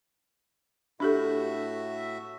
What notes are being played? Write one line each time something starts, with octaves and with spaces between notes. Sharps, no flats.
A2 D4 F#4 G4 A4 E5